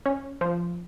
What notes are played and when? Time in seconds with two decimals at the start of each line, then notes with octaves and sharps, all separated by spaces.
0.06 C#4
0.41 F3